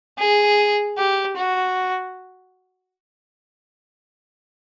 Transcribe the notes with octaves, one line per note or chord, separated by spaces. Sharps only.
G#4
G4
F#4